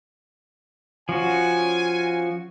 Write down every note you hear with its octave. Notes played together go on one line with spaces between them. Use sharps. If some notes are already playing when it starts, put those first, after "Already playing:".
F3 C#4 F#4 G#5